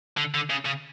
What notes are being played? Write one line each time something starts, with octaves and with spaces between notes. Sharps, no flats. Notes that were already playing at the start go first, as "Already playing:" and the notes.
D3
D3
C#3
C#3